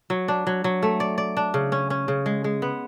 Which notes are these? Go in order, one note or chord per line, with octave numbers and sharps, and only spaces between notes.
F#3
D4
F#3
F#3
A3
D5
D5
D4
C#3
C#4
C#4
C#3
G#3
G#3
B3